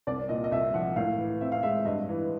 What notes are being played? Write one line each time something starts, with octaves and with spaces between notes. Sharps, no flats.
C2 D5
A#2 D#5
D#5
C2 E5
F3 F#5
A2 F5
E3
C4 E5
F5
G#3 E5
G2 D#5
E3